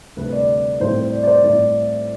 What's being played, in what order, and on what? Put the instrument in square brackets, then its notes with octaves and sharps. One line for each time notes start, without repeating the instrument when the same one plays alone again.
[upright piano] D2 C3 G3 C4 B4
D5
A2 G3 C4 C5
D5
D5
C5
A2 G3 C4 D5